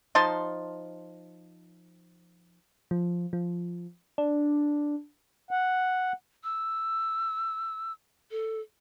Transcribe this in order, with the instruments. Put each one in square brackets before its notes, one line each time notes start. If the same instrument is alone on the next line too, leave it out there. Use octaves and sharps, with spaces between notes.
[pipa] F3 D#4 A5 C6
[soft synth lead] F3
F3
D4
[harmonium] F#5
[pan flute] E6
A4